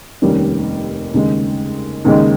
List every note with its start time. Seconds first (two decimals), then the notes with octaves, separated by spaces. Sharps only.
0.22 F1 D#2 D#3 G3 C#4
1.14 D#2 C#3 G#3
2.05 D#2 C#3 G#3 D#4